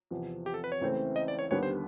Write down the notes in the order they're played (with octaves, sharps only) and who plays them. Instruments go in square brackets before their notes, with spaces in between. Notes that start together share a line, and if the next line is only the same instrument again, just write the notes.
[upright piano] E2 C3 F3
[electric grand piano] G4
A4
B4
C#5
[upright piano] C#2 C#3 E3 A3 C4
[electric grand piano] D#5
D5
C#5
[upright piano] D#2 D3 G3 B3 [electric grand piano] C#5
[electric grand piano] C5